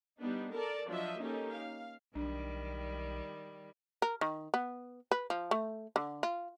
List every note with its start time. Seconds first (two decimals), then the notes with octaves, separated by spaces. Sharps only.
0.21 G3 B3 D4 D#4
0.54 A4 A#4 D5 A5
0.90 F3 F#3 D4 D#5 E5
1.21 A#3 C#4 D#4 G4 A4
1.54 F5
2.15 B1 D#3 G3 D4
4.02 A#4
4.21 D#3
4.54 B3
5.11 B4
5.30 F3
5.51 A3
5.96 D3
6.23 F4